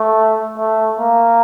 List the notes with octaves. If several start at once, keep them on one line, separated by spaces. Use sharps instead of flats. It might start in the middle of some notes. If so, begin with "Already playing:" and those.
Already playing: A3
A3
A#3